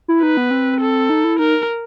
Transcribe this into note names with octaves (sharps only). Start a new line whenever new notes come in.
E4
D#4 B4
B3
C4
A4
D#4
E4
D#4 A#4